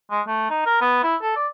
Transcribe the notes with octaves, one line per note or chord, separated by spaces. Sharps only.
G#3
A3
D#4
A#4
B3
E4
A4
D5